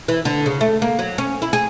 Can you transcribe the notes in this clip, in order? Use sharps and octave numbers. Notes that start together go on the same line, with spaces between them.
E3
D3
C#3
A3
A#3
F#3
C#4
E4
G#4